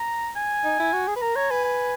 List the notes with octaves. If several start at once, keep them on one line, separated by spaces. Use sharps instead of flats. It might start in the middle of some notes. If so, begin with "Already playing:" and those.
Already playing: A#5
G#5
D#4
E4
F#4
G#4
B4
A#4 A#5
C#5 A#5
B4 G#5
G#5